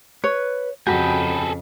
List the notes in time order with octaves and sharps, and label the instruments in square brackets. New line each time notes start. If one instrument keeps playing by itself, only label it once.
[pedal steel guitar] B4 [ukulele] C#5
[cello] F2 C#3 [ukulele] F#4 [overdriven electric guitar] G#4 A4 [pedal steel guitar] G5 B5